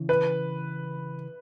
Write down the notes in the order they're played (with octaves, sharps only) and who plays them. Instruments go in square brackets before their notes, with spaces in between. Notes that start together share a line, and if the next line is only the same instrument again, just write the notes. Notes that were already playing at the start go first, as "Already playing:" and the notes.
Already playing: [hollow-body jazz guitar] C#3 E3
[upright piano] B4